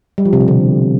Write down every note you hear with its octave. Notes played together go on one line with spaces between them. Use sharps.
G3
F3
C3
B2
D3